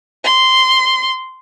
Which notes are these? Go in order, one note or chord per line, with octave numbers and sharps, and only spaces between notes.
C6